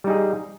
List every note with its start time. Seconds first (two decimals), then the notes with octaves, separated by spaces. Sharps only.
0.04 G3
0.07 D#4
0.10 G#4